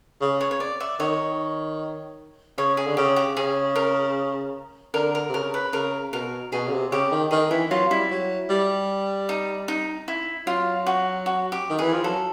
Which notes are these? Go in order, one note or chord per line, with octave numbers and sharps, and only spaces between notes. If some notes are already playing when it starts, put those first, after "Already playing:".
C#3
C#5
C#5
D5
D5 E5
D#3 C#5 D#5
C#3 C#5
G#4
D3
C#3 G4
G4
C#3 G#4
A#4
D3 A#4
A#4
C3
C#3 A#4
B4
C#3 A#4
B2 A#4
B2 G#4
C#3
C3
C#3 G4
D#3
D#3 G#4
E3 E4
F#3 F4
G3 E4
F#3
G3
D#4
D#4
E4
F#3 F4
F#4
F#4
G4
D#3
E3 G#4
F3
F#3 A4